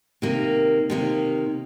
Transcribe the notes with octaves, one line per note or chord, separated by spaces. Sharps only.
C3 D#3 A#3
C3 D#3 A#3